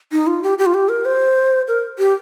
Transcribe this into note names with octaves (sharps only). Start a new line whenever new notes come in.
D#4
F4
G4
G4
F4
G4
A#4
C5
A#4
G4